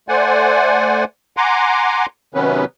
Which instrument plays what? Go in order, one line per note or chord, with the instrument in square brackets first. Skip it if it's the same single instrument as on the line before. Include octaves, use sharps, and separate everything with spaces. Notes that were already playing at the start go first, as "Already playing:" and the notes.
[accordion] A3 C5 D5 F#5 G#5
F#5 G#5 A#5 C6 D6
C3 D#3 F#3 B3 C#4 B4